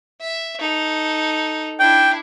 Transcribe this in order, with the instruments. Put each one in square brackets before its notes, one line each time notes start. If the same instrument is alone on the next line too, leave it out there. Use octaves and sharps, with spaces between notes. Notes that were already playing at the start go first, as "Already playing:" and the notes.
[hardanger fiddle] E5
D#4 A4
[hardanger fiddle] D4 E4 [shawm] G5